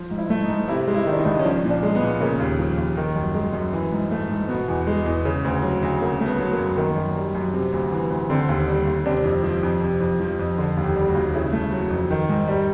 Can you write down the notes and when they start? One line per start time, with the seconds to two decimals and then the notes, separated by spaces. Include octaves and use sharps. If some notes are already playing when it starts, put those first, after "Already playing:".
Already playing: F3
0.11 G#2
0.18 E4
0.30 A3
0.42 D#4
0.49 G#2
0.68 C3 E4
0.87 G#3
0.94 E4
1.07 D#3
1.12 D4
1.19 D#4
1.25 C#2
1.39 C#4
1.44 F3 D4
1.64 A#2
1.70 D4
1.83 G#3
1.95 B3
2.02 A#2
2.20 C#3 A#3
2.40 D#2
2.59 F3
2.78 D#2
2.97 D#3
3.16 F#2
3.34 G#3
3.53 F#2
3.73 E3
3.92 G#2
4.11 A3
4.30 G#2
4.48 B2 B3
4.68 E2
4.87 G#3
5.06 E2
5.25 C#3
5.44 D2
5.63 F#3
5.82 D2
6.01 C#3 A#3
6.21 A3
6.26 B3
6.39 F#3
6.53 A#3
6.58 F#2
6.77 D#3 A#3
6.96 F#2
7.16 G3
7.35 F#2
7.53 C3
7.72 D2
7.92 E3
8.10 D2
8.30 D3 C4
8.49 D#2
8.67 G3
8.87 D#2
9.06 C3 D4
9.24 F2
9.43 F3
9.63 F2
9.82 C3
10.00 F2
10.20 F3
10.39 F2
10.58 D3
10.77 D#2
10.83 G4
10.96 G3
11.08 F#4
11.15 D#2
11.34 C#3 E4
11.53 A3
11.72 F#3
11.90 F2
12.11 D#3
12.29 G#2
12.48 G3